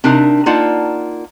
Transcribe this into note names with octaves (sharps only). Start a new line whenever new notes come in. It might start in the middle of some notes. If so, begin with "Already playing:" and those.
C3 D4 D#4 A#4
A#3 D#4 F4 D5 F#5 A5